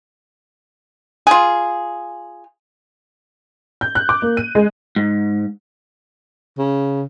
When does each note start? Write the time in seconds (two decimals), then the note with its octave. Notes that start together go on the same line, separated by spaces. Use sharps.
1.27 F4 G#4
3.81 G6
3.95 F#6
4.09 D6
4.22 A#3
4.37 D#7
4.55 G#3
4.96 G#2
6.58 C#3